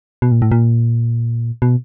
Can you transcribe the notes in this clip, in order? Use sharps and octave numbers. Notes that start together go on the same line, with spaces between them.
B2
A#2
A2
A#2
B2